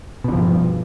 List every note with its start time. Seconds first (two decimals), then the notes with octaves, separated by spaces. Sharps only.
0.24 B2
0.28 D3
0.32 F3
0.36 G2